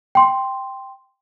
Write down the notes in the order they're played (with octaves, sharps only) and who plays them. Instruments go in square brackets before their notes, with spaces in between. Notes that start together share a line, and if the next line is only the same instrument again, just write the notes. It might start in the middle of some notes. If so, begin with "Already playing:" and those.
[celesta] G5 C6